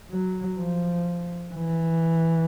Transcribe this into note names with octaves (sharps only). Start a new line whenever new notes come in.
F#3
F3
E3